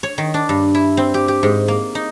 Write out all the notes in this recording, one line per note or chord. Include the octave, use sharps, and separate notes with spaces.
C#5
D#3
D4
G2
E4
C4
G4
G4
G#2
A#3
D#4